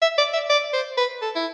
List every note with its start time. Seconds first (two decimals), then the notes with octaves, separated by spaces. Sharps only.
0.02 E5
0.18 D5
0.33 E5
0.49 D5
0.73 C5
0.97 B4
1.22 A4
1.35 E4